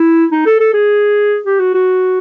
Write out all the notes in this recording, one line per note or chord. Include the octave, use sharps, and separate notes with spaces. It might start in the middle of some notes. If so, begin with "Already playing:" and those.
Already playing: E4
D#4
A4
A4
G#4
G4
F#4
F#4